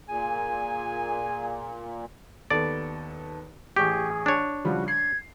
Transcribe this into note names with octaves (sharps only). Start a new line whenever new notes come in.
A#2 G#4 G#5
D#2 B3 A4 D5
A1 G4 G#4 C#6
D4 C#5
C#3 F3 G3 F#4
G#6 C7